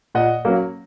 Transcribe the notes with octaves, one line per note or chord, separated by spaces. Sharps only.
A#2 D#5 F#5
F#3 A#3 C#4